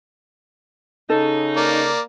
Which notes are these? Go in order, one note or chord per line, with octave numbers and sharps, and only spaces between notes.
C#3 D#4 A4
A#3 D5